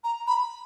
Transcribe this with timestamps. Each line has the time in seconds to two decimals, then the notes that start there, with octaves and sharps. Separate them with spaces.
0.04 A#5
0.27 B5